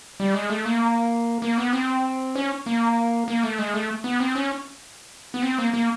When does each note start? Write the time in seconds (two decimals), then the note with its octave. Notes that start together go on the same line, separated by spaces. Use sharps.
0.20 G3
0.34 G#3
0.50 A3
0.66 A#3
1.42 A#3
1.58 B3
1.73 C4
2.36 C#4
2.66 A#3
3.28 A#3
3.43 A3
3.58 G#3
3.74 A3
4.04 B3
4.20 C4
4.35 C#4
5.34 B3
5.43 C4
5.58 A#3
5.74 A#3